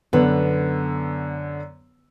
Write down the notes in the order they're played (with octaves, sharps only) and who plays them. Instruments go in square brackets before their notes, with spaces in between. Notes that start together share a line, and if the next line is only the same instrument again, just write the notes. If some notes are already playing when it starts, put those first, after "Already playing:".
[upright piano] F#2 D3 [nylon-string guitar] B3